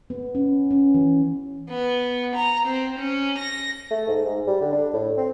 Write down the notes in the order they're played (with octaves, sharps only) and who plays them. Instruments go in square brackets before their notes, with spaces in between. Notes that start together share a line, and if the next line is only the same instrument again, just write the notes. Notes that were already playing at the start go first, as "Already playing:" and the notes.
[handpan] B3
C#4
C#4
E3
[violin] B3
A#5
C4
C#4
A#6
[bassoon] A3
G#2
G#2
G3
D3
D4
A2
C4